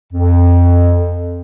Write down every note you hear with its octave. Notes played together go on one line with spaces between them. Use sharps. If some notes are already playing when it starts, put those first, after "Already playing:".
F2